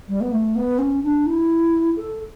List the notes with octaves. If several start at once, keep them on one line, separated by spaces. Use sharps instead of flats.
G3
B3
A3
B3
C#4
D4
E4
A4